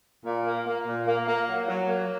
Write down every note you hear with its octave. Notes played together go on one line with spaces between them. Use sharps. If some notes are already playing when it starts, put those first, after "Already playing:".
A#2
A#3
A#3
A#2
A#3
A#3
F#3
F#3
A#3